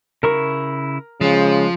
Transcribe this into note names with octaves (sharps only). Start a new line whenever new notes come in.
C#3 E4 A#4 C#6
C#3 F3 G#3